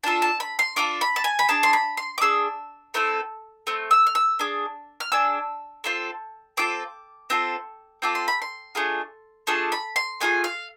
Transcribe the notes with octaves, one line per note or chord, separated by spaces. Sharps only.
D4 F4 A4 A5
A5
B5
C6
D4 F4 A4 D6
B5
A5
G#5
B5
D4 G#4 A5
C6
B5
C6
D6
D4 G#4 E6
A3 C4 E4 A4
A3 C4
E6
F6
E6
D4 G#4
F6
D4 G#4 E6
C4 F4 A4
C4 F4 A4 D6
C4 F4 A4
C4 F4 A4 D6
C6
B5
C6
A3 D4 F4 G#4
A3 D4 F4 G#4 A5
B5
C6
A3 D4 F4 G#4 G#5
F5